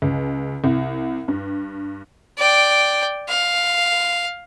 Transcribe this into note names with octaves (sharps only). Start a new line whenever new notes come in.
C#2
C2
G2
D5 G5
F5